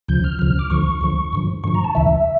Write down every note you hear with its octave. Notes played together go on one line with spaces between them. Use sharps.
D2 C#3 F3 G6
F6
D2 C#3 F3 F6
D6
D2 D3 F3 C#6
D2 D3 F3
G2 D3 F3
G2 D3 F3 C#6
A#5
A5
D2 C#3 E3 E5